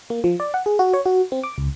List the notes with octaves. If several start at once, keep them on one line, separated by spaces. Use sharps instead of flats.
A#3
F3
D5
F#5
G#4
F#4
C#5
F#4
C4
D6
C#2